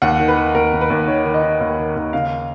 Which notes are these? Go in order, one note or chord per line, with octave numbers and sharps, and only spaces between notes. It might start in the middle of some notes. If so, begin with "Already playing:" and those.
D#2 F#5
D#3
B4
D#3
D#2 A#4
D#2
B4
D#2
D#3 C#5
D#3
D#5
D#3
D#2
D#3
D#2
C#3 F5